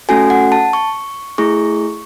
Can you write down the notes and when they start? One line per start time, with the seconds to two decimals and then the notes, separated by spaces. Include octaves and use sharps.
0.09 A3 C#4 F#4 A4 G#5
0.30 F#5
0.52 A5
0.73 C#6
1.38 A3 E4 G#4 C#6